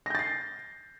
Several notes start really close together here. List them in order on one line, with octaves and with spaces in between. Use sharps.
A#6 G6 A6 C7